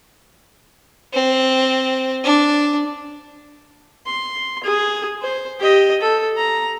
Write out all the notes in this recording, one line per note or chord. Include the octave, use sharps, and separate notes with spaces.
C4
D4
C6
G#4
C5
G4 D#5
A4
A#5